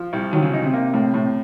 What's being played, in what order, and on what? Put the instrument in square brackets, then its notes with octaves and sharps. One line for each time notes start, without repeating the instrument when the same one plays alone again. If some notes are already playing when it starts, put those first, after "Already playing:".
Already playing: [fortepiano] F3
C2
[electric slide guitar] D#3 [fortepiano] F#3
[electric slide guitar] C#3
[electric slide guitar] C#3 [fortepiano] D#4
[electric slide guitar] C3
[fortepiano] A#3
A2
A2